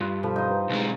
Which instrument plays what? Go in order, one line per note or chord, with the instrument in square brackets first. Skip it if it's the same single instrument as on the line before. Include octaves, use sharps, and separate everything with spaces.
[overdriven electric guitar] G2 [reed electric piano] F4 C6 F#6
[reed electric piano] B2 A4 B5 [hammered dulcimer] F3
[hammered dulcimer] D#4 C5
[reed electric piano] D4 G4 B4
[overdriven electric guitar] B1 G#3